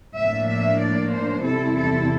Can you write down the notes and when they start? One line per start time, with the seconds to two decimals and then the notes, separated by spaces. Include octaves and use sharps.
0.18 A2 F3 A#3 D4 E5
0.50 E5
0.81 D5
1.13 C5
1.44 E2 C3 G3 C4 E4 A4
1.77 A4